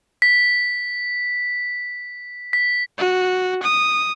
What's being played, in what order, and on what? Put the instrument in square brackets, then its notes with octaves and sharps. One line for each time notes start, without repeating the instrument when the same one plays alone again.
[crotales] B6
B6
[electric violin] F#4
D#6